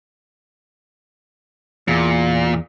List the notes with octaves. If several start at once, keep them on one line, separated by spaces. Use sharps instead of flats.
E2 A#2